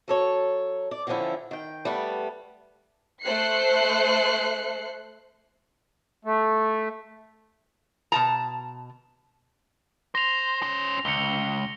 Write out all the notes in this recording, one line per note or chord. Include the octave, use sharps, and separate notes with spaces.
F#3 A4 C#5
D5
A2 D3 E3 F3 C#4 E4
D#3 G5
G3 A3 B3 B4
A3 C5 F#6 C7 C#7
A3
B2 A5 A#5
C5 A#6 F7
C#4 C5
C#2 C#7 G7